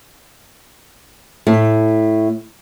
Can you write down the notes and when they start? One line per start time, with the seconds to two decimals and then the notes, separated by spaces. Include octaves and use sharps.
1.47 A2 A3